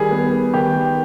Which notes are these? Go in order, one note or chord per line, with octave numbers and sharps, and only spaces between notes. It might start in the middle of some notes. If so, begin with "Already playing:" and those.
Already playing: D#3 G3 G#4
B3
D#3 G4